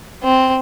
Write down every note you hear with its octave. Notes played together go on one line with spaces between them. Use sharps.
C4